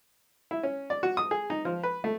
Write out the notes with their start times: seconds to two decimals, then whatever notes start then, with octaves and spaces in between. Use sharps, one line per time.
0.51 E4
0.63 C#4
0.90 D5
1.03 F#4
1.17 D#6
1.31 G#4
1.50 D#4
1.65 F3
1.83 B4
2.04 A3